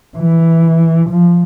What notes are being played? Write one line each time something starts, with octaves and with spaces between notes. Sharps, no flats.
E3
F3